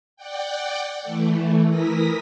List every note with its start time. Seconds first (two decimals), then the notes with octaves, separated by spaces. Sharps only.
0.16 D5 F#5 G5
1.02 E3 A3
1.68 E3 E4 A#4 D#6 A#6 B6